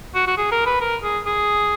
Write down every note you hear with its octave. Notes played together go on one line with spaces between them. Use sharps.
F#4
F#4
G#4
A#4
B4
A#4
G#4
G#4